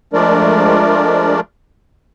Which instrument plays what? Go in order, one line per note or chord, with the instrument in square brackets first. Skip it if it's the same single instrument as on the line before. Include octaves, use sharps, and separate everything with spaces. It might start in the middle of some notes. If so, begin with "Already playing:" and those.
[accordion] F3 G#3 A3 D4 A#4 D5